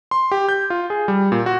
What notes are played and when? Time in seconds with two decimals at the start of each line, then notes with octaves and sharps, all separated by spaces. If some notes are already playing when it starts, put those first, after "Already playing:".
0.11 C6
0.32 G4
0.49 G6
0.70 F4
0.90 G#4
1.08 G3
1.32 A#2
1.46 F#4